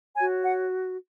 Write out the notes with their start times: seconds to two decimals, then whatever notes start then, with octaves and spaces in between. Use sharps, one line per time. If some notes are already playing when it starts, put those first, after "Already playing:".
0.16 C#5 G#5
0.20 F#4
0.43 F#5